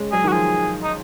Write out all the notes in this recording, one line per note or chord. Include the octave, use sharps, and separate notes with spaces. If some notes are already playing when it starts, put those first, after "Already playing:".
Already playing: G#3 C#4
F#3 G#4
D#3
F#4
F3 G#4
D#4